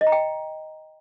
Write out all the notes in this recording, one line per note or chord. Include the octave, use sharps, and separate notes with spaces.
D#5
A#5
G5